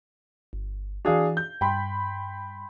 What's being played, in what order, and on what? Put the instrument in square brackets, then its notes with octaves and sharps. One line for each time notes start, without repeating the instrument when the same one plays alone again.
[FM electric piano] G1
[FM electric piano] E3 F#4 [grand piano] D4 G#4 F5
[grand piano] G6
[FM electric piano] G2 [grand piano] G5 B5 C6